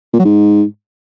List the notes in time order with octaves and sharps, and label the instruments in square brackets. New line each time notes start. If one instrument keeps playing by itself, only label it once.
[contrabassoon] A#2
F#3
G#2